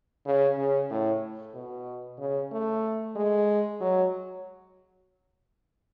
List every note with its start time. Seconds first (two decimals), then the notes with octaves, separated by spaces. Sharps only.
0.26 C#3
0.58 C#3
0.90 A2
1.54 B2
2.19 C#3
2.52 A3
3.16 G#3
3.81 F#3